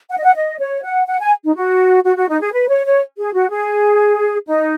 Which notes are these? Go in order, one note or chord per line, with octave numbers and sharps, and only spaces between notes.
F#5
D#5
F#5
D#5
C#5
F#5
F#5
G#5
D#4
F#4
F#4
F#4
D#4
G#4
B4
C#5
C#5
G#4
F#4
G#4
D#4